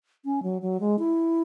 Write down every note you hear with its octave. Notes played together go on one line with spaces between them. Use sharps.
C#4
F#3
F#3
G#3
E4